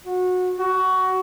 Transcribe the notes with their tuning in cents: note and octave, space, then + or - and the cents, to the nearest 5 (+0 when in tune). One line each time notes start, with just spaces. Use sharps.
F#4 -20
F#4 +15